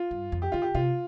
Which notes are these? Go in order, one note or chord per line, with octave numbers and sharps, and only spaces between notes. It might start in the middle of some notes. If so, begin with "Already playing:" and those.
Already playing: F4
G2
F2
G4
D3 F4
G4
C3 F4